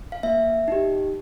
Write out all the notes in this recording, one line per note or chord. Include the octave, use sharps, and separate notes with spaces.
F5
A#3 E5
D#4 G4